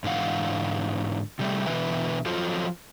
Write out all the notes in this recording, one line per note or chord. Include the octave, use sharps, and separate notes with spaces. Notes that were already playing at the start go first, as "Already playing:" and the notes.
G#2 D3 E3 F5 F#5
C3 G3 A3
B2 D3 E3 B4 E5
F3 F#3 F4 A4 C5